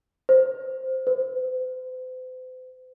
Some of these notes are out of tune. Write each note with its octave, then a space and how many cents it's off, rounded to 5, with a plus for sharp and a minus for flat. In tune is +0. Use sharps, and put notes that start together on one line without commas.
C5 +0
C5 -40